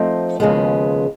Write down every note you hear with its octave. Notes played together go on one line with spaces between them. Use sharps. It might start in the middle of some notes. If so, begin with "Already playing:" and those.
Already playing: F3 A3 C4 D#4
D#2 C#3 F3 G#3 B3